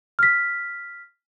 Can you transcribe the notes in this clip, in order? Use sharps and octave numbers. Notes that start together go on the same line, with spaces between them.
F6 B6